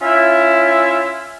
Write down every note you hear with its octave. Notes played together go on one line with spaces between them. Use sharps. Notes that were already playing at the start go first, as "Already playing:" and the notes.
C#4 E4 F4 E5